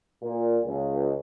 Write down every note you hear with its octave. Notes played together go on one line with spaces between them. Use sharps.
A#2
C#2